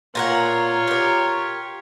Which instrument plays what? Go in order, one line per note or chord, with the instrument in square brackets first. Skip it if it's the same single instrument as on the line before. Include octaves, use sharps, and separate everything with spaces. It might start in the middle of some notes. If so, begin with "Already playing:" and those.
[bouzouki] A#2 A#4 F#5 [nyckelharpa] F4 C#5
[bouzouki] G4 A#4